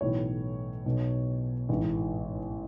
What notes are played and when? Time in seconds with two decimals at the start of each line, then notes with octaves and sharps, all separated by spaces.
0.01 B1 A2 E3 C#5
0.86 B1 B2
1.69 A1 G#2 E3